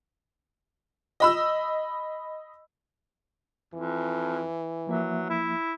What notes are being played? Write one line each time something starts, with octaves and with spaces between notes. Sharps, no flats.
D#5 B5 E6
F2 E3
F3 F#3 A#3 E5
E4